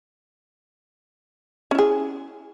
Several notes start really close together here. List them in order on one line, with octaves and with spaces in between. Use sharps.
C#4 E4 G#4